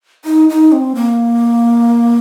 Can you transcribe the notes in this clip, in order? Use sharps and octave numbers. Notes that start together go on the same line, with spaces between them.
D#4
D#4
C4
A#3